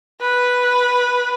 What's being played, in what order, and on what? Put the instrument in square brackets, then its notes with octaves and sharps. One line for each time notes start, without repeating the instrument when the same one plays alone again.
[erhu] B4